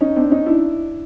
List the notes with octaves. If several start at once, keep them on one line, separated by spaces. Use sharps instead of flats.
C#4 D#4
C4 D4
C#4 D#4
D4 E4